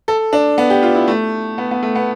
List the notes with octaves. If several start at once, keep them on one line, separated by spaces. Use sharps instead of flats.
A4
D4
B3
G4
F4
E4
A3
B3
B3
A3
B3